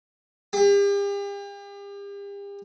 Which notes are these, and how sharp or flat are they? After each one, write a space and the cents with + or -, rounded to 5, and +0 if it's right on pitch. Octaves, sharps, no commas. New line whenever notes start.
G4 +40